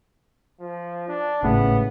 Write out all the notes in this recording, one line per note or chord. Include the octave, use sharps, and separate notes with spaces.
F3
D4
G#1 A2 C#3 B3